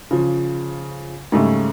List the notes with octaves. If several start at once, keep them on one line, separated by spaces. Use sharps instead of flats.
C#3 F3
G#2 C#3 G3 A3